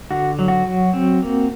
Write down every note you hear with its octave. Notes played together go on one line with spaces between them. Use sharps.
D3 F#4
F#3
F#4
F#3
C4
A#3